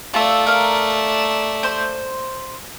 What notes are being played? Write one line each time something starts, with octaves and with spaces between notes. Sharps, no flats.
A3 F4 A4 D5
A#4 F5
C5 C6